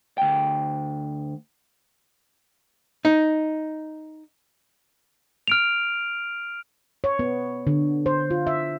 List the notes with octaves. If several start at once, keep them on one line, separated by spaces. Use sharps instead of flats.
D2 G5
D#4
F6 D7 F7
C#5
B3
D3
C5
F4
E5